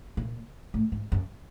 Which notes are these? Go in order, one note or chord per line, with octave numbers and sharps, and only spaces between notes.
A#2
A2
G#2
F#2